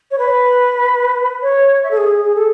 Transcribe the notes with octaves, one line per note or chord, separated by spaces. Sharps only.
C#5
B4
C#5
E5
A4
G#4
G#4
A4